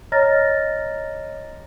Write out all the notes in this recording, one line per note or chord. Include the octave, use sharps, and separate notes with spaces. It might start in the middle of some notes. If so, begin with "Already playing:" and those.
C#5 D#5 A#5 F6 A6 A#6